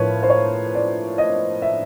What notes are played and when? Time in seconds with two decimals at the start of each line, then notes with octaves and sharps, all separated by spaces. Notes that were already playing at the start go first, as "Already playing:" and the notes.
Already playing: A2 F3 A#4 B4 C#5
0.23 C5
0.30 C#5
0.75 D5
1.18 D#5
1.62 E5